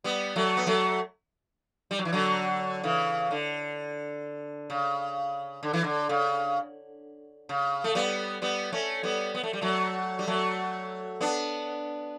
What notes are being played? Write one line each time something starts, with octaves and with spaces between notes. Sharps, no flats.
G3 B3
F#3 A3
B3
F#3 A3
G3
F#3
E3
D3 F#3
C#3 E3
D3
C#3
D3
E3
D3
C#3
C#3
A3
G3 B3
G3 B3
A3 C#4
G3 B3
B3
A3
G3
F#3 A3
G3
F#3 A3
B3 D4